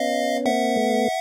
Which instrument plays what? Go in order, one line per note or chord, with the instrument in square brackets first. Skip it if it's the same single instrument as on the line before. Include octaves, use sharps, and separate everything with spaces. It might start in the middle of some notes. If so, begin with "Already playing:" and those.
Already playing: [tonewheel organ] B3 C#4 [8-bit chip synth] D#5 F5
[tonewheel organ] A#3 C4 [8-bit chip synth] E5 F#5
[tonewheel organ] A3 B3